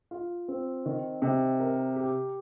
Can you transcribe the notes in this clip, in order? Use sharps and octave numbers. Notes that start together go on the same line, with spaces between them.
F4
C4
D#3
C3
A#4
G4